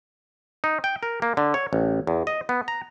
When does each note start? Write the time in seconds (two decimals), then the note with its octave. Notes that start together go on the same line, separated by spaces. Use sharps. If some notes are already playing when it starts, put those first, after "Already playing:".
0.64 D#4
0.84 G5
1.03 A#4
1.22 A#3
1.37 D3
1.54 C#5
1.73 A1
2.07 E2
2.27 D#5
2.49 B3
2.68 A#5